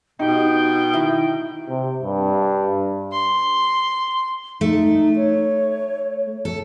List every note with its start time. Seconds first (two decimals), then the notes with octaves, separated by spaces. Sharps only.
0.19 B2 D#4 G4 G5
0.93 D#3 E4
1.69 C3
2.03 G2
3.12 C6
4.61 A3 D#4
5.16 C#5
6.45 A4